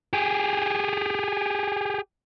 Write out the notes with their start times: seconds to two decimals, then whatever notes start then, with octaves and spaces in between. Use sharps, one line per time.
0.13 G4 G#4